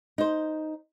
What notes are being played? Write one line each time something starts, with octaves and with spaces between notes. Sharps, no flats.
D#4 C5